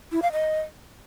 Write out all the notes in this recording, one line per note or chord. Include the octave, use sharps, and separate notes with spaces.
E4
F5
D#5